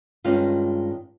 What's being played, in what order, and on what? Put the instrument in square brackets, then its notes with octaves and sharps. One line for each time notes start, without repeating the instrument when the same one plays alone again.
[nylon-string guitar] G2 D#3 G#3 C#4 F4